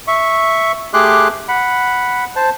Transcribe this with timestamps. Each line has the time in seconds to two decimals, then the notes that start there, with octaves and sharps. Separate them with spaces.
0.08 E5 C#6
0.94 A3 G4 G#4 C6 D6 F#6
1.48 F#5 B5
2.36 C5 A5